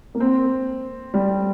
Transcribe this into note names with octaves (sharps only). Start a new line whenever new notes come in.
A#3
C4
G3